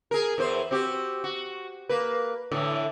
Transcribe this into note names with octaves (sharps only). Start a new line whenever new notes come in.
G#4 A#4
E2 E3 C5
C4 F#4 G4
F#4
A#3 B4
A2 D3 E3